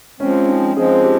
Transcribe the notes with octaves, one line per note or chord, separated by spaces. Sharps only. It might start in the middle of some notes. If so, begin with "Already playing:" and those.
F3 G#3 C4 C#4
D#4
F3 G#3 C4 G#4
G4